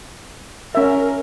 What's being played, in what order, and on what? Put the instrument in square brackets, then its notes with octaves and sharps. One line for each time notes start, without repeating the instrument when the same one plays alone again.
[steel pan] C#4 E5 [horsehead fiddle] A#4